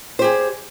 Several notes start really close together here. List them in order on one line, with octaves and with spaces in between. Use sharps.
C5 G4 G#4